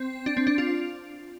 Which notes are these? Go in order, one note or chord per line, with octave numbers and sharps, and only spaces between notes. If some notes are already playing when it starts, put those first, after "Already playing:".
Already playing: C4
D4
C4
D4
F4